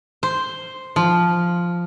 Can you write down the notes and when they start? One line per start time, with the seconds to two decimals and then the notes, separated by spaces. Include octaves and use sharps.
0.23 C5
0.96 F3